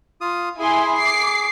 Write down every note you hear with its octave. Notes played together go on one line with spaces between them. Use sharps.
F4 D#6
E4 G#4 G#5 C6
D6 C7